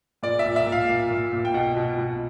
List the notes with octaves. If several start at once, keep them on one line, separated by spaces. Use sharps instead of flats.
A#2 D5
E5
A#2
E5
A#2
F5
A#2
A#2
A#2
G5
B2 F#5
B2
B2